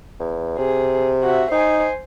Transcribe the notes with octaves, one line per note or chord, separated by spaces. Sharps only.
E2
C3 G#4
F#4 E5
D#4 C5 G#5